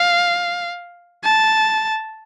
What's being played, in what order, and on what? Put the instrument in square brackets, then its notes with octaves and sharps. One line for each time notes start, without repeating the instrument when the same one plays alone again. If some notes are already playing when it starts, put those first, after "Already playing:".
Already playing: [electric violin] F5
A5